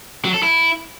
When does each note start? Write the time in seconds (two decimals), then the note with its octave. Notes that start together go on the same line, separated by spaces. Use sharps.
0.25 F#3
0.34 A4
0.43 E4